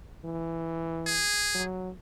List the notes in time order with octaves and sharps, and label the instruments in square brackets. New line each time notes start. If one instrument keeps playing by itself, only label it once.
[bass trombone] E3
[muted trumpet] G#4
[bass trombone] F#3